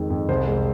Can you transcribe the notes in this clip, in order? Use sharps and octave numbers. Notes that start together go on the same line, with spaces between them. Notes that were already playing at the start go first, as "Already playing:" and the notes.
Already playing: F2 D#3 G#3
F2
C2 C5
G#3